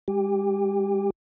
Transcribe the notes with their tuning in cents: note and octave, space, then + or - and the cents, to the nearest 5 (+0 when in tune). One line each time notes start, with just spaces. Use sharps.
G#3 -40 G4 +0 G5 +45